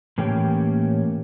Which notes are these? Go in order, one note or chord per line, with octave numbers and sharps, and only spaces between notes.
A2 E3 A#3 C#4 G4 G5